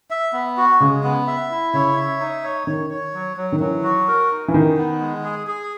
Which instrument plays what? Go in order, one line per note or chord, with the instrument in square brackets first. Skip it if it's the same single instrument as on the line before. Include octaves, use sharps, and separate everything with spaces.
[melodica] E5
B3
F#4
[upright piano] C#3 [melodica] G#3
[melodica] B3
E5
E4
[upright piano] C#3 [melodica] C#5
[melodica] E5
D#4
C#5
[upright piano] D#3 [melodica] C#5
[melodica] C#5
F#3
F#3
[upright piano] D#3
[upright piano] E3 [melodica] F#3
[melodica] F#4
A#4
D#4
[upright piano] E3
[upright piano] D#3 [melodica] D#4
[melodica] B3
G#3
G#4
G#4